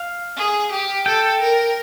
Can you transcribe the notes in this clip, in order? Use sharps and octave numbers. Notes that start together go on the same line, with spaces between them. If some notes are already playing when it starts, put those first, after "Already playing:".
Already playing: F5
G#4
G4
A4 G5
A#4